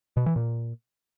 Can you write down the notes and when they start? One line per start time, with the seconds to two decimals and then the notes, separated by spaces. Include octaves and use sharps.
0.17 B2
0.26 E3
0.36 A#2